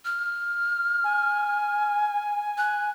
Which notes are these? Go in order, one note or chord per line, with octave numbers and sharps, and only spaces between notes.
F6
G#5
F#6